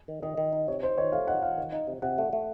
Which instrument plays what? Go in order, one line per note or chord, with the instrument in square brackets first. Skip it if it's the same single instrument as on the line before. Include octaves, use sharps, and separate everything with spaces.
[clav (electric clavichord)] D#3
[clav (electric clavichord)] D#3 [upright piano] D#5
[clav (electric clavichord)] D#3
D#4
[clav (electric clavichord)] C3 [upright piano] C#5
[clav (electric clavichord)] D#4 [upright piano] C5
[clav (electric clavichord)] D#3 [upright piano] C#5
[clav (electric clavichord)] A3 [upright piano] F5
[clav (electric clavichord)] D#4 [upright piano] F#5
[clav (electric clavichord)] D#4 [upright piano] F5
[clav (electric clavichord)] D#3
D#4
C3
[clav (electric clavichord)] C3 [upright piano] F#5
[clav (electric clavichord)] A3
A3